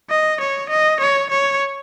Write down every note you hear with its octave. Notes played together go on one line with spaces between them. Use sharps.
D#5
C#5
D#5
C#5
C#5